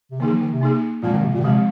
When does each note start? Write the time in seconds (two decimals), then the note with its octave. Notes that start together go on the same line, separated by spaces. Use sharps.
0.11 C3
0.20 D#3 A#3 D#4 G#4
0.31 F3
0.41 D#3
0.51 C3
0.61 A#3 D#4 G#4
1.02 A#2 F3 G#3 C4
1.13 D#3
1.23 C3
1.34 A#2
1.40 D#3
1.44 C3 F3 G#3 C4